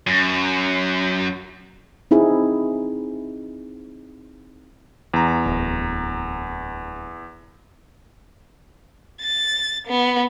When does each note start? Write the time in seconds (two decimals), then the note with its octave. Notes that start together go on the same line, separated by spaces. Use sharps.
0.07 F#2
2.11 C4 D#4 E4 G#4
5.14 E2 A#5
5.46 D1
9.21 A6
9.87 B3